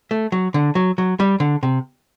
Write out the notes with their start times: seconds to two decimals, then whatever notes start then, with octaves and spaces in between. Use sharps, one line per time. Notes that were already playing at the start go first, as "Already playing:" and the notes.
0.11 A3
0.32 F#3
0.54 D3
0.75 F#3
0.98 F#3
1.20 G3
1.40 D3
1.63 C3